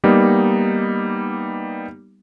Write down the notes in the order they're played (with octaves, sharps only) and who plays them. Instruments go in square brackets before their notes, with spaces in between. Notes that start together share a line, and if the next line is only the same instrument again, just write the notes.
[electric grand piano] G3 A#3 B3 D#4